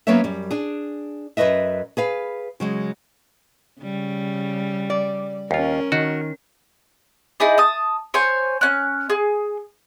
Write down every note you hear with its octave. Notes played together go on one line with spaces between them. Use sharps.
F#3 A#3 B3 C#4 C#5 E5
F#2 G3
D4 G#4
F#2 B2 B4 D#5 E5
G#4 B4 F5
C#3 F#3 G#3
C#3 G3
D5
D#2 C#4 F4 A#4
D#3 F#4
D#4 E4 G#4 D5
A5 D#6
C5 C#5 G#5 C#6
C#4 F#6
G#4